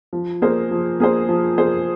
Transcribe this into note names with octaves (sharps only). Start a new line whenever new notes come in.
F3
A#3 G#4 C5
F3
A#3 G#4 C5
F3
A#3 G#4 C5